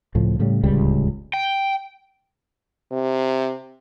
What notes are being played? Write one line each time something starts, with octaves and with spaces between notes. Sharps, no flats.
C#2 A2 F3
A2 C#3 G3
D1 C#2 C#3 G3
G5
C3